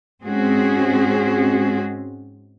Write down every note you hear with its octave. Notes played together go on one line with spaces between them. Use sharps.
G#2 G#3 C4 C#4 F#4 G#4